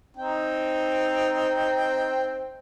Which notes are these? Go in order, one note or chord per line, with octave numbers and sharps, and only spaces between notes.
C4 D#4 G5